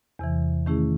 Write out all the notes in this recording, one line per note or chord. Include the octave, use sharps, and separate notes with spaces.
E2 C3 E3
D#3 A3 C#4 E4 G#4